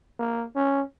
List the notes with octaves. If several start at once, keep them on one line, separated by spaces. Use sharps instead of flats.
A#3
C#4